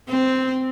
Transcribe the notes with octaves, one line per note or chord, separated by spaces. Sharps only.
C4